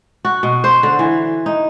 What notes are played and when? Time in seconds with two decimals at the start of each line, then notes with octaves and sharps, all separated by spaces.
0.25 F#4
0.43 B2
0.64 C5
0.83 D3
0.99 E3
1.46 D#4